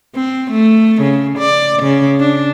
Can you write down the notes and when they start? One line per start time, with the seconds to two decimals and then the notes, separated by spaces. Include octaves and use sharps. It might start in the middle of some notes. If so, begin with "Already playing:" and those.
0.16 C4
0.51 A3
1.02 C#3
1.38 D5
1.83 C#3
2.20 D4